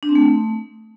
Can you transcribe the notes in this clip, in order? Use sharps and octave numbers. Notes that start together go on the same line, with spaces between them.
D4
C4
A3